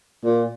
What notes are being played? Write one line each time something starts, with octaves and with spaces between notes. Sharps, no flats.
A#2